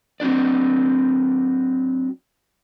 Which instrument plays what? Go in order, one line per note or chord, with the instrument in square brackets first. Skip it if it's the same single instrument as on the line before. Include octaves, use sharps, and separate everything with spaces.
[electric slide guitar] F#3 C4 D4 D5